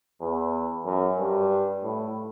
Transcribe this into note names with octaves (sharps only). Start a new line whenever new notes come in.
E2
F#2
G2
A2